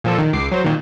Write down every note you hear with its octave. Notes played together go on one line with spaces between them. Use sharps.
A#2 F3 A4
D#3
C#2 D6 C7
F#3 C5
A#2 D#3